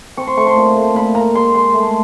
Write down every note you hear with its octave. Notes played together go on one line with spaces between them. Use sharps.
C4 C#6
C6
A3 C#6
C6
A#2
A3
A#2 B5
A#2 A#5
G#3 C6
G#3 C6
A3